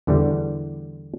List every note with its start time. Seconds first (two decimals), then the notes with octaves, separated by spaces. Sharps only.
0.07 E2 D3 E3 G3